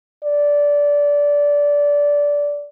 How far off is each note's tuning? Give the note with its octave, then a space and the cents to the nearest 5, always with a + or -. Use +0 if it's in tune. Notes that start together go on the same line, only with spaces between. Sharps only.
D5 -15